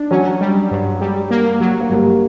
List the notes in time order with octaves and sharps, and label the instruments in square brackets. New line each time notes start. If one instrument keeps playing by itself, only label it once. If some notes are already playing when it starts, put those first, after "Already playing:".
Already playing: [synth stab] D4
[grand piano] F#3 [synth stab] C#4
[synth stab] G3
G2
G3
A#3
F#3
[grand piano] A#3
[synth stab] G1 [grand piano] G3